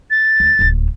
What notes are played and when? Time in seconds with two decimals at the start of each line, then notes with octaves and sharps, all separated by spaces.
0.11 A6
0.40 D2
0.59 D1 D#2